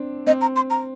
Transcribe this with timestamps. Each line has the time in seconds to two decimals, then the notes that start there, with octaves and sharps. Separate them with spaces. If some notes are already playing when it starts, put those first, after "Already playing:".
Already playing: C4 D4
0.26 C4 D#5
0.41 A#5
0.56 C6
0.70 A#5